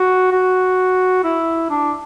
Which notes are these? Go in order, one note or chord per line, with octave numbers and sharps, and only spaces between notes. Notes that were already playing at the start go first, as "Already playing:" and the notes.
Already playing: F#4
F#4
E4
D4